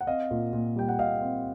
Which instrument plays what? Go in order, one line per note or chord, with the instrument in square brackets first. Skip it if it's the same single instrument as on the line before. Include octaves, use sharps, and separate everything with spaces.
[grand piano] F#5
C4 D#5 F5
A#2
A#2
G3 G5
F#5
A#2 D#5 F5
C4